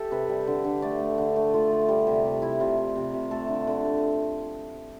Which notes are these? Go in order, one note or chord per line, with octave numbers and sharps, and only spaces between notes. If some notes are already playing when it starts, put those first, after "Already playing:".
Already playing: G4 A4 E5
C3 B4
G3
D3
D3
A3 D5
A3
D3
A3
A3 F4
A3
G3
C3
C3
C3 E4
C3 F4
G3
C3
C3
A3 A4
D3
D3
A3